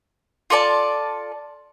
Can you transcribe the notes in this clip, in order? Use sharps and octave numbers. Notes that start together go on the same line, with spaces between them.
F4 A4 D5 A5